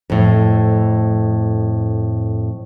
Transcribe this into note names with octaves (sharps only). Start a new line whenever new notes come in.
F2 A2